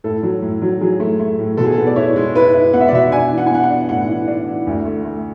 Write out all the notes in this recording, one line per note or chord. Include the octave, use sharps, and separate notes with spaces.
A2 A4
F#3
A2
F#3
F#3 G#4
A3
A3
A2
B2 A4
G#4
A4
B3
D5
E4 C#5
G#3
E4 B4
E4
B3 F#5
E5
D5
B2 E5
D4 G#5
E3
F#5
G#5
B3 F#5
F#5
D4
A2 F#5
E3
D4
E3
D2
A3
A3